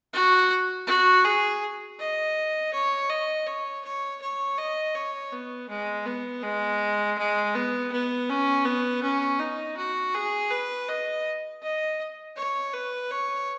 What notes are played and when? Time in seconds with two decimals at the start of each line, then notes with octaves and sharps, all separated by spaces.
0.13 F#4
0.87 F#4
1.24 G#4
1.99 D#5
2.73 C#5
3.10 D#5
3.47 C#5
3.85 C#5
4.21 C#5
4.58 D#5
4.95 C#5
5.32 B3
5.69 G#3
6.06 B3
6.43 G#3
7.18 G#3
7.55 B3
7.92 B3
8.29 C#4
8.65 B3
9.03 C#4
9.39 D#4
9.77 F#4
10.15 G#4
10.51 B4
10.89 D#5
11.63 D#5
12.37 C#5
12.73 B4
13.11 C#5